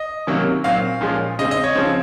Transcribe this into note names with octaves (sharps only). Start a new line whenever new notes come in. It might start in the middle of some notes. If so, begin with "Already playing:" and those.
Already playing: D#5
C3 D#3 F#3 A#3 C#4
A#2 F#3 C4 F5
A#2 F3 G#3 C#4
C#3 G#3 C4 D#5
D#5
C#5
C#3 F3 C4